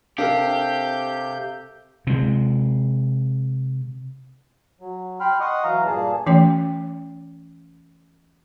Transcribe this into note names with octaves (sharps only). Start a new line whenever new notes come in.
C3 D4 G4 A4 A#4 F5 G6
C3 G#3
F#3
G5 B5 C6 F6
D#5 F#5 C6 C#6 D#6
E3 F#3 F5 A#5
G2 A#2 A#3 G#4 A5
E3 A3 C#4 C#5 G5